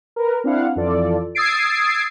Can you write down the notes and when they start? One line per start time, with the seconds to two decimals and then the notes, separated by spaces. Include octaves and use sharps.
0.16 A#4 B4
0.44 C4 D4 E4 F5 F#5
0.76 F2 E3 F4 A4 D5
1.35 D#6 E6 G#6 A6 C7 D7